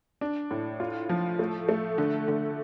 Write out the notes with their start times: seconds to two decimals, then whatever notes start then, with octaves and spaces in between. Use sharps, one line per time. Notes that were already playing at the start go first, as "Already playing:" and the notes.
0.21 D4
0.51 A2
0.80 F4
1.09 F3
1.39 A3
1.69 A3
1.98 D3
2.28 D3